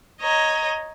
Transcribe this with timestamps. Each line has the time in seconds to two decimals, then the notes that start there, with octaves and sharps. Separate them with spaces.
0.21 C#5 D#5 A#5